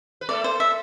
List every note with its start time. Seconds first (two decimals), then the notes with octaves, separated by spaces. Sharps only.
0.21 B4
0.29 A3 A4 D5
0.44 C5
0.60 E5